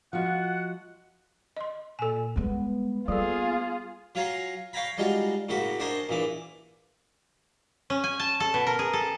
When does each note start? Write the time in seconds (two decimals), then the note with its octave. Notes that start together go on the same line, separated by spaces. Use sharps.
0.13 F3 F4 F#4 D#5 F#5
1.57 D#5 C6
1.99 A#2 A4 G#5
2.36 G3 G#3 B3
3.08 G3 A#3 F4 G#4 A4
4.15 F#3 F4 C#5 G#5 A#5 C6
4.73 C#5 F5 G5 G#5 A#5 B5
4.97 G3 G#3 D#4 F4 F#4
5.49 A2 C#3 A#3 F#4 B5
5.80 D4 F#4 A#4 C5 D#5 G#5
6.09 A#1 A#2 E3 D6
7.90 C#4
8.04 G#5
8.19 A5
8.40 A4
8.54 B2
8.67 A#4
8.79 G#4
8.93 A4